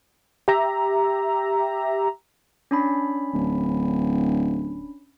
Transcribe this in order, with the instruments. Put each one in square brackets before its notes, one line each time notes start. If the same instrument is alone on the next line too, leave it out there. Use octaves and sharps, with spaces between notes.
[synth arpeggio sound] G4 E5 A#5
[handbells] C#4 D4 B5
[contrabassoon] D1